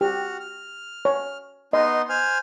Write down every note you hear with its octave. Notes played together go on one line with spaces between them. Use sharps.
F#4 G4 F6
F6
C#5
B3 D#4 D#5 C6
C5 G#5 F6